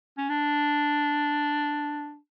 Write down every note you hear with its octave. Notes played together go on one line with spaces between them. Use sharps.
C#4
D4